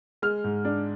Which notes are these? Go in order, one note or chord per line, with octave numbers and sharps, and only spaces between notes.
G#3 F6
G#2
D4